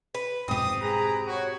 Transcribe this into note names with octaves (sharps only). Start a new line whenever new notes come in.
B4
F1 G#2 B2 C4 G4 D#6
G#4 B4 A#5
F#4 C#5